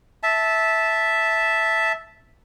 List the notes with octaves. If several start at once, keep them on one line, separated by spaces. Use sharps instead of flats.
E5 A5